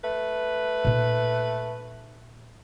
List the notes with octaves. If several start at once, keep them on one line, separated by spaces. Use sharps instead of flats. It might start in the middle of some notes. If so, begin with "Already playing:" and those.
A3 B4
A#2 D#4